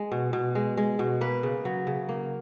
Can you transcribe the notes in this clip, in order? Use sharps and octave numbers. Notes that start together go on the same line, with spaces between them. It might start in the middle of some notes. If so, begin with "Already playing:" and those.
Already playing: G#3
B2
B2
G#3
G#3
B2
A#3 B4
C#3
F#3
C#3
A#3